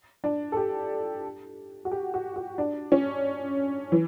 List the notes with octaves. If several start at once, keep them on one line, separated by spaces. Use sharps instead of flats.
D4
A4
G4
F#4
G4
F#4
F#4
D4
C#4
E3